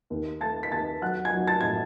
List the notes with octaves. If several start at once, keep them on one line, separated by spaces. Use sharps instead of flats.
D#2
A3 A5 A6
B6
D#2 A5 A6
F#3 F#5 F#6
G#5 G#6
F#3
A5 A6
A2 G#6